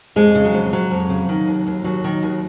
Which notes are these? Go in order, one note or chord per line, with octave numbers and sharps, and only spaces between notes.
F2 G#3
C#3
F#3
F2
F2 F#3
F2
C#3
D#3
D#2
D#2
D#2 F#3
D#3
D#2